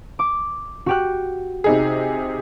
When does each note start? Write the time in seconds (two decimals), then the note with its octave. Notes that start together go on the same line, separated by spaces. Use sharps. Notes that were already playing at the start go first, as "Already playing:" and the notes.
0.19 D6
0.86 F#4 G4 F#6
1.64 C3 D#4 G#4